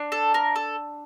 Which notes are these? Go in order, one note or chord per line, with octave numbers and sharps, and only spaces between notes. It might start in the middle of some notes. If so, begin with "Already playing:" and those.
Already playing: D4
A4
A#4
A4